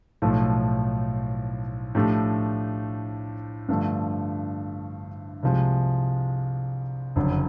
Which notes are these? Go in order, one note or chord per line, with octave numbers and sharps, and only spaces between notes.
B1 A2 F3 A3
A2 F3 A3 D4 G4
G2 D3 F3 A3
C2 C3 F3 G#3
F#1 F2 D3 F#3